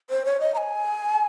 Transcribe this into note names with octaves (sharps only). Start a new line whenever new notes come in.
C5
C#5
D#5
A#5
G#5